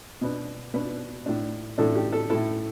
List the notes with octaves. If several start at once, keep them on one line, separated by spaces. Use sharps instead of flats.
B2 B3 D4
B2 B3 D4 B4
A2 A3 D4
A2 A3 D4 A4
G4
A4
A2 A3 E4 A4